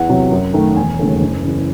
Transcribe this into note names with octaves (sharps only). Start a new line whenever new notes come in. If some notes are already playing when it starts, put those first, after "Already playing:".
Already playing: E2 F#5
C3 F#3
F#2
D#3 A3
E1 G#5
D#2 C#3 F#3 A3
F#1
E2 C#3